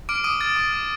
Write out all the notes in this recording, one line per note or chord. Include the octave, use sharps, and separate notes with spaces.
D6 F6 D7
D6 D#6 D#7
F6 A6
D6
F6